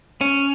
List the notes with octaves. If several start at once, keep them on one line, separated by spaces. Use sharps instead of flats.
C#4